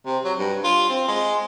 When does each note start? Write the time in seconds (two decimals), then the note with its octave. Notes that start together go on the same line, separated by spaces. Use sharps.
0.06 C3
0.25 F#3
0.38 G2
0.64 F4
0.90 C4
1.08 G#3